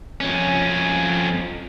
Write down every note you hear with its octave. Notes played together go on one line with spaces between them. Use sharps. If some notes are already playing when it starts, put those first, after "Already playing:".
F2 C#4